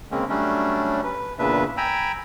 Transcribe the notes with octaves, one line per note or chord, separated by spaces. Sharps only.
C#3 G#3 A#3 C4 C#4
F#3 G3 A3 C#4 D4
B4
E2 A#2 C#3 D4 B4 E5
G5 G#5 A#5 B5 E6